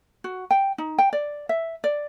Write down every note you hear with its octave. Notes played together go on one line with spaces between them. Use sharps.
F#4
G5
D#4
G5
D5
E5
D5